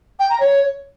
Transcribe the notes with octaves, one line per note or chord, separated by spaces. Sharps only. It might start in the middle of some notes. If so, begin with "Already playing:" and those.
G5
A#5
C#5